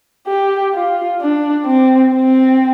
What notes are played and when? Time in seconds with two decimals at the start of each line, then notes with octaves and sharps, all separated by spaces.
0.27 G4
0.73 F4
1.20 D4
1.66 C4
2.13 C4